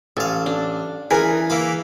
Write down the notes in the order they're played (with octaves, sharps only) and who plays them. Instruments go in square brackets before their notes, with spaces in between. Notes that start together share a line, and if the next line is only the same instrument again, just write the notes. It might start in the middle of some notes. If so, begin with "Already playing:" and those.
[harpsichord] A1 F5 [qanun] A4 G#5
[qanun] D4
[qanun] E3 [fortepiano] G#4 A#4 [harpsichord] B4 G#5
[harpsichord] E3 A#3 B5 [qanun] F5